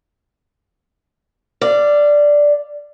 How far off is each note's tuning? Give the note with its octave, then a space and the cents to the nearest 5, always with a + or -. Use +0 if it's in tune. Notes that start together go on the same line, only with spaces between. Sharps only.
D5 +0 F5 -30